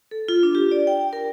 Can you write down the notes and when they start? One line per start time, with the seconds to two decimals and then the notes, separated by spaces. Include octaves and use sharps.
0.11 A4
0.29 F4
0.43 D4
0.55 G4
0.71 D5
0.87 G5
1.13 A#4